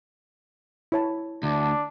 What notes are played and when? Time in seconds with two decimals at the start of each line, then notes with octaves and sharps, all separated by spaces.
0.92 E4 C#5 A5
1.43 D2 D4